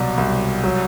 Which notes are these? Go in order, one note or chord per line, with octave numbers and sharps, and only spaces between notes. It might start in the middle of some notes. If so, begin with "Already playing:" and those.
Already playing: C2 B2 F#3 D5
C2
F#3